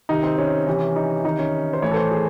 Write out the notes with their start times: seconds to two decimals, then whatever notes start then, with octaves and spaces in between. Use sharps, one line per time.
0.09 C3 D#3 D#4
0.23 C4
0.38 C#4
0.67 C3 E3 C#4
0.96 D#4
1.25 C3 D#3 D#4
1.39 C#4
1.73 C5
1.82 A2 E3 C#5
1.91 A4
1.96 C5
2.11 G#4